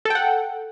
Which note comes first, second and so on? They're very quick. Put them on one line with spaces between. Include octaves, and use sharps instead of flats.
A4 G5 F#5